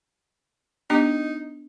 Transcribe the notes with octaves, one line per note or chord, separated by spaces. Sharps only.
B3 D4 D#4 G4